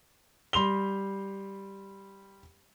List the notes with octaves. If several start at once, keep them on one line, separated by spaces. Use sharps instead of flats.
G3 C6 F7 G7